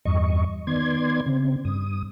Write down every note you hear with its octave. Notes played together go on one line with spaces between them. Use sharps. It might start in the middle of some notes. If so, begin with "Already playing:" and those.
E2 G2 D#5 C#6
D#3 B3 D5 C6 G#6
C#3 C4
G2 D#6